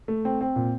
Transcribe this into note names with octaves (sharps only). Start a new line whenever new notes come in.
A3
C4
C4
A#2